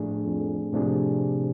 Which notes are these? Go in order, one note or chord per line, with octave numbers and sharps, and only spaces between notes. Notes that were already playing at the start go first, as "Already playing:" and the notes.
Already playing: A2 F3 A3 D4 G#4
F2
A2 C3 F3 A3 D4 G#4